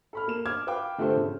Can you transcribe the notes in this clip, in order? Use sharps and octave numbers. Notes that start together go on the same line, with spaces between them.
A4 B5 F6
A#3 E7
D6 F6 G#6
B4 F5 G5 D6
D3 A3 F4 G4 A4 C5
C#3